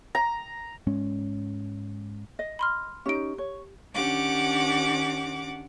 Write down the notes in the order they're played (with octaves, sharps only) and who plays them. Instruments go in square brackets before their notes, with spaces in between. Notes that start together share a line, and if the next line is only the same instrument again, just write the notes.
[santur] A#5
[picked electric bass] G#2 G#3 C#4
[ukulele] D#5
[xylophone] B5 C6 F6
[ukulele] C#4 D#4 [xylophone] G4 D7
[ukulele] C#5
[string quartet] D#3 C#4 D4 G4 F#5 D6